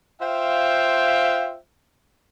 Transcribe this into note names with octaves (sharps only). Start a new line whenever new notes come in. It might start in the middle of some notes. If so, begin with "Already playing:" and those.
F4 C5 E5 F5 G5